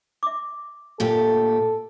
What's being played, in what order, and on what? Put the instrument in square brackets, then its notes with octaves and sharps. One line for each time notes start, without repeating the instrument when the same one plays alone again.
[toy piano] E5 D6
[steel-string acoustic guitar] D2 A#2 G4 [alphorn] A4